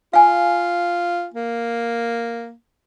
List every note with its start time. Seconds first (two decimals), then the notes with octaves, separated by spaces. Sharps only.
0.13 F4 F5 G#5
1.34 A#3